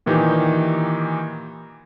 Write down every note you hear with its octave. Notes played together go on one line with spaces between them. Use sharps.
A#2 D#3 E3 D#4 G4